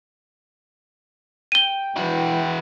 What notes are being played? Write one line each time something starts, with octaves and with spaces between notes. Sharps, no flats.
G5 D#7 G7
E3 E4 F#4